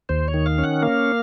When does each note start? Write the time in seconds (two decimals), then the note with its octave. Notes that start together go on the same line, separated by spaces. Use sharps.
0.09 D#2 C5
0.28 C#5
0.34 D#3
0.46 F5
0.58 C#4
0.64 F#5
0.82 A#3 F5